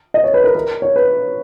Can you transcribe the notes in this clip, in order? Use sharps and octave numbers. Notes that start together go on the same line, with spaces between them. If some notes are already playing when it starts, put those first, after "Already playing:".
D#5
C#5
B4
A#4
A#4
C#5
B4